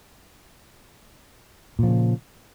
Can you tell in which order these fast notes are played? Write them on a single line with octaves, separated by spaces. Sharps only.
A#2 F3 C#3